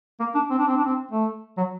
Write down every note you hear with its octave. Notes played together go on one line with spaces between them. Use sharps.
A#3
D4
C4
D4
C4
D4
C4
A3
F#3